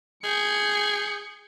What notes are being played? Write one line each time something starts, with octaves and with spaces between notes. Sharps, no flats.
G#4 G6 C#7